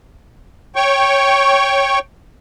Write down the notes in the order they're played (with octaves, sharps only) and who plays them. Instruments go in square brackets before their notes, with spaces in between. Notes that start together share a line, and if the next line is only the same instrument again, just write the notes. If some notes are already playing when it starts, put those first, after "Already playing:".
[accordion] C#5 G5 C#6